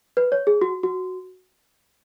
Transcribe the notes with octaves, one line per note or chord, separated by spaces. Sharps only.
B4
C#5
G#4
F#4
F#4